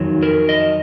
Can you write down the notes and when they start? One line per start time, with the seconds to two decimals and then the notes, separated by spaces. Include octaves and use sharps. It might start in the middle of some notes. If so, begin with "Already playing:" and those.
Already playing: F2 D#3 F#3
0.23 A#4
0.49 D#5